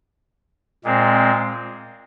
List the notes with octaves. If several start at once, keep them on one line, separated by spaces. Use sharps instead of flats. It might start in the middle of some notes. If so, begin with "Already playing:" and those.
A#2 G#3 C4